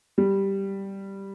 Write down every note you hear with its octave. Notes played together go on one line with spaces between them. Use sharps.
G3